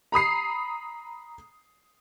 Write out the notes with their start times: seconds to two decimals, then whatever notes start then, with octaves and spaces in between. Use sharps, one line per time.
0.12 A#5 B5 D#6 C7